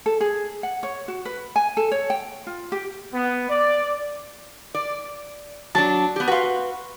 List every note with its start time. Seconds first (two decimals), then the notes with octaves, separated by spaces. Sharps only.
0.06 A4
0.21 G#4
0.63 F#5
0.83 C#5
1.08 F#4
1.25 B4
1.56 G#5
1.77 A4
1.92 C#5
2.10 G5
2.47 F4
2.72 G4
3.13 B3
3.49 D5
4.74 D5
5.75 F#3 D4 A5
6.16 B3 G4
6.28 F#4 B4 F5 C6